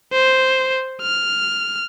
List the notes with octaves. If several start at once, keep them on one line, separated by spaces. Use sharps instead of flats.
C5
F6